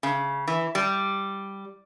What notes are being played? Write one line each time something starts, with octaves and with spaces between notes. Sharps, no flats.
C#3
E3
G3